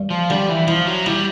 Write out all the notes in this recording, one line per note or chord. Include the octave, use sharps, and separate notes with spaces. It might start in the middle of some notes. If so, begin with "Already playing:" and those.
Already playing: G2
F3
D3 G3
E3
F3 E4
F#3
G3 E4